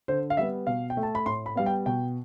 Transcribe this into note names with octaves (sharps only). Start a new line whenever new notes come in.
D3 C5
F5
G3 B3 E5
B2 F5
G5
A3
A5
B5
A2 C6
B5
G3 B3 F5
G5
B2 G5